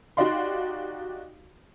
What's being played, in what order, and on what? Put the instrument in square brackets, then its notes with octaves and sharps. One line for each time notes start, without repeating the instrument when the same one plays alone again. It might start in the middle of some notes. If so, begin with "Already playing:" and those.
[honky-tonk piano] D#4 F#4 G4 D5 F5 C6